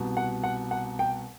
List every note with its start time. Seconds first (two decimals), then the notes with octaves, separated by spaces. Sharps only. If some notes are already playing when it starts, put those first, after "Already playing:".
Already playing: C2 B2
0.17 F#5
0.44 F#5
0.71 F#5
0.99 G5